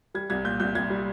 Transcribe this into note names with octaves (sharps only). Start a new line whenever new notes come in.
G3 G#6
C2 G#6
A#2 G6
C2 G6
C2 G#6
G3